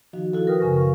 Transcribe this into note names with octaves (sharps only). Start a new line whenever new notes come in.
D#3 F3 D#4 F#4
E4 F#4 A4 F5
A#4 B4 G5 D#6 F6
F#2 C#3 G#5 C#6 A#6
F5 C#6